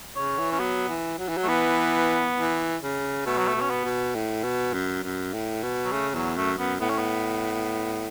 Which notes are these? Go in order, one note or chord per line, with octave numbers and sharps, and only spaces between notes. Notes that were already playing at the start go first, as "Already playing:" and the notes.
C#3 C#5
E3
C#4
F#3 B3
E3
F#3
E3
F#3
A3
E3 B3
E3
C#3
B2 A3
F#3
A3
B2
C#4
B3
B2
A2
B2
F#2
F#2
A2
B2
F#3
C#3 A3
E2 F#3
F#2 A3
F#2 B3
A2 B3
C#4
B3